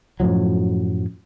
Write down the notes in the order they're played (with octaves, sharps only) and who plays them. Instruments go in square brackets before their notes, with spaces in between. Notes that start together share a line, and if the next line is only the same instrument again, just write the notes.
[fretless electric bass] F#2 A2 F3 F#3